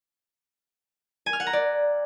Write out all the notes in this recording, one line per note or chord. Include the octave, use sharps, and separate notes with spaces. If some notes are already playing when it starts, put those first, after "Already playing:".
G#5
F6
F#5
A#5
D5